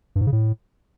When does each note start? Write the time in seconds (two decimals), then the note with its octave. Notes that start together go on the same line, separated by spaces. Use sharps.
0.16 G2
0.21 G#2
0.27 C#3
0.32 A2